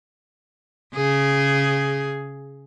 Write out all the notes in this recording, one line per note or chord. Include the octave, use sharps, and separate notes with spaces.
C#3 G#4